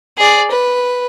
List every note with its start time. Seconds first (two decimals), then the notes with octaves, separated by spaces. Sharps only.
0.17 G#4 D5
0.51 B4